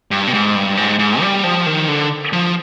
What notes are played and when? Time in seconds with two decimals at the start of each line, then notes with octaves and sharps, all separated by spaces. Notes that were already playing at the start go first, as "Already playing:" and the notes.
0.11 G2
0.27 B2
0.34 G#2
0.56 G2
0.77 G#2
0.99 G#2
1.22 G3
1.44 F3
1.66 D#3
1.88 D3
2.33 F3